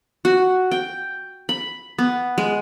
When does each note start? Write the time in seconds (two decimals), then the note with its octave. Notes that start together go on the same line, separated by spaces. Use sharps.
0.25 F#4
0.71 G5
1.49 B5
1.99 B3
2.38 G#3